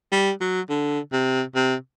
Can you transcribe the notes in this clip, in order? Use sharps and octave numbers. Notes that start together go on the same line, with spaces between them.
G3
F#3
D3
C3
C3